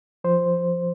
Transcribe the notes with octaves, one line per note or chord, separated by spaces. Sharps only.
F3 C5